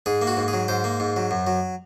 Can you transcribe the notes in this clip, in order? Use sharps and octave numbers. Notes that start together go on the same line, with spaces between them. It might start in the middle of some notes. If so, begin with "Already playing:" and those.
G#2 G#4
A#3
F#4
G#2
G#4
F#3
G#2 C5
A#3
G#2
F#3
F#2
F#3